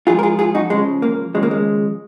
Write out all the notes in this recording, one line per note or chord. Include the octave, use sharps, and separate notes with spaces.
G#2 F3 G#3 F4 G#4
A#4
F4 G#4
F4 G#4
D#4 F#4
C#2 C#3 F3 G#3
A#3
D#2 C#3 F3 G#3
A#3
G#3